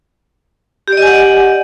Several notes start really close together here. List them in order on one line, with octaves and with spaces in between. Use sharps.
G4 D5 D#5 G#5 F#5